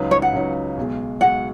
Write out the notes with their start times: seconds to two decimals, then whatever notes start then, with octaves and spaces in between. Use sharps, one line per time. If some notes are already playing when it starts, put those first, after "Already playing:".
Already playing: C#2 C#3 F#3 D#4 B4
0.11 C#5
0.22 F#5
0.33 C#2 C#3 F#3 D#4 B4
0.78 B1 B2 G#3
1.21 B1 B2 G#3 F#5